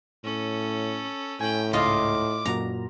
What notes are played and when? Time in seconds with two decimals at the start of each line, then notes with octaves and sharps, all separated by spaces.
0.24 A2 C#4 A4
1.41 A2 C#4 G5 G#5
1.73 C#2 G#2 F4 D#5 F5 D6 F6
2.45 F#2 A#2 F#4 A#5